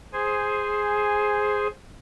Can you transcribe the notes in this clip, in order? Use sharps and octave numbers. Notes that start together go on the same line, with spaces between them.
G#4 C5 G#5